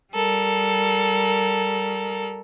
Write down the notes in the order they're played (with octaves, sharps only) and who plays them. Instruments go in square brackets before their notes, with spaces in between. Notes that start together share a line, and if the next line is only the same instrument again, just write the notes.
[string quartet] G3 A4 A#4